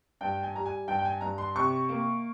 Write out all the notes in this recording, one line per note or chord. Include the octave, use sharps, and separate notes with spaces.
G2 G5
G#5
G3 A#5
G#5
G2 G5
G5
G#5
G2 A#5
C6
C3 C#6
A#3